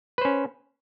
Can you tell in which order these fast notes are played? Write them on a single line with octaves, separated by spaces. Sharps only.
B4 C5 C#4